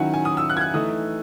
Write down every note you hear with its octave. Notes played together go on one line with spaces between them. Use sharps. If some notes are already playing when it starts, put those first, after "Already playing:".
Already playing: D#3 F#3 C#4 E4 F#5 G#5
G#5
D#6
E6
F#6
G#6
F#6
E3 A3 D#4 D#6